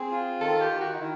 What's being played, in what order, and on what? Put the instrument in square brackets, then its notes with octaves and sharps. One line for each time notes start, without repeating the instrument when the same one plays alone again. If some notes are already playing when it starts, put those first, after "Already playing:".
Already playing: [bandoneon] C4 [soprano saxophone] G#4
[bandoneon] F4
[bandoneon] D#3 [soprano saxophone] A4
[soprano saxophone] G4
[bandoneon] D#3
[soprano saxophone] F#4
D#4
[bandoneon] D#3 [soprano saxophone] E4